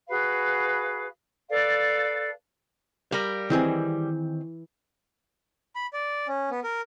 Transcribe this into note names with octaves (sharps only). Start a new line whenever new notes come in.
F#4 G#4 B4 F5
A4 B4 D5 F5
G3 A#4 F5
D#3 E3 C4 G#4
B5
D5
C#4
B3
A#4